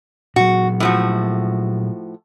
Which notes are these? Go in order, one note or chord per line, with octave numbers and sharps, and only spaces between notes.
A#2 F#3 F#4
A2 F3 F#4